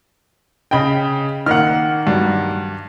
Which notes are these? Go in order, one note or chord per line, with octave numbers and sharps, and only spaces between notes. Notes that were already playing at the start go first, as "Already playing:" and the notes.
C#3 D#5 G5 B5
D#3 A#3 F#5 F6
G2 F#3